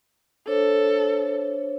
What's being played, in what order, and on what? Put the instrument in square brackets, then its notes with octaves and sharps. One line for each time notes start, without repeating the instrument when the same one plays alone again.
[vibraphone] D4 C5 C#5 [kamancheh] A4